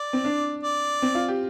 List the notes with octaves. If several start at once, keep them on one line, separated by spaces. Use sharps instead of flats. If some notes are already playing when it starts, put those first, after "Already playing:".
Already playing: D5
C4
D4
D5
C4
F4
G4